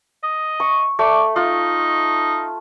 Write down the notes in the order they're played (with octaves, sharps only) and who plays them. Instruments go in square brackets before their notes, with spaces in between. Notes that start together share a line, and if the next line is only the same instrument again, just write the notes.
[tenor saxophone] D#5
[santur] C#6
[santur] A3 [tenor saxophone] D5
[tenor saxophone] D#4 [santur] F4